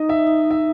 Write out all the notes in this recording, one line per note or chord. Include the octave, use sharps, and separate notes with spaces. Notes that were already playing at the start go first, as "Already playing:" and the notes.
Already playing: D#4 D#5
E5
E5